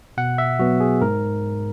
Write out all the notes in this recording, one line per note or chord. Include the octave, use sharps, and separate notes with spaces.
B2 F#5
E5
F#3 B3 F#4
G#4
G#2 A#4